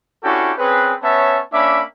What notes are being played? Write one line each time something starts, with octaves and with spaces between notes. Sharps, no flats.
C#4 D4 E4 F#4 G4 A4
C4 C#4 G#4 B4
B3 C#4 C#5 E5 A5
A#3 C#4 D4 E5 B5 D6